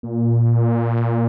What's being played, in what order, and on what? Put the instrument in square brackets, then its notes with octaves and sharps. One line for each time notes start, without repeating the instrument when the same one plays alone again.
[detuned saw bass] A#2